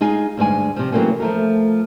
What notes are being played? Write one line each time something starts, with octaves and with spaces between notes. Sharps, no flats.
G#3 D#4 F4 G#4
D2 G2 G#3 G#5
C3 F3
E3 F#3 A3 A#3 C4 C#4
F3 A3 A#4